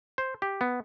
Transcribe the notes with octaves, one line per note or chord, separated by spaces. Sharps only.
C5
G4
B3